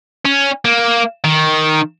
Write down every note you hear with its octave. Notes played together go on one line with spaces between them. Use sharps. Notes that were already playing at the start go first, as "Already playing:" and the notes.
C#4
A#3
D#3